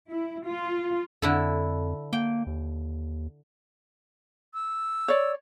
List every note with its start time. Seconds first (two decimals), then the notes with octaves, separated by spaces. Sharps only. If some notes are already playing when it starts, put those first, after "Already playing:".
0.10 E4
0.47 F4
1.22 F2 D3 E4 A4
2.13 A#3 G5
2.47 D#2
4.54 E6
5.08 C#5 D5